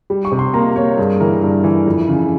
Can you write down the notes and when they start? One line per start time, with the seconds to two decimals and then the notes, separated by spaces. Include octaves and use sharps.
0.10 G3
0.25 C#6
0.32 C3
0.39 C6
0.54 A#3 A#5
0.76 A#3 C#5
0.97 G2 G#4
1.20 E3 A#4
1.42 G2
1.64 E3
1.86 F2
2.08 C#3